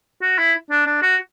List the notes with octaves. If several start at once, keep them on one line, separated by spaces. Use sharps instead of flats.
F#4
E4
D4
D4
F#4